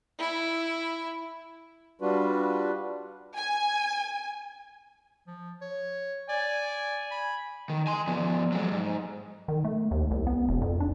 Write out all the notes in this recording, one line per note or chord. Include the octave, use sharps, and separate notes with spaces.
E4
G3 D4 F4 F#4 B4
G#5
F3
C#5
D5 G#5
B5
D#3
G#5 C6
F3 B3
F#3 G#3
G#2
D#3
A3
D#2
C2
B3
E1
F2
D4